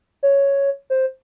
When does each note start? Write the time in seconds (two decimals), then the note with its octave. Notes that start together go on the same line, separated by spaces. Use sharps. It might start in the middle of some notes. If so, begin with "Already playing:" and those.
0.23 C#5
0.90 C5